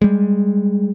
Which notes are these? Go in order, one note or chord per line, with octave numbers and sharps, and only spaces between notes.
G3 G#3